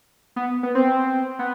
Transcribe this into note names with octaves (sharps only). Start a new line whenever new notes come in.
B3
B3
C4
B3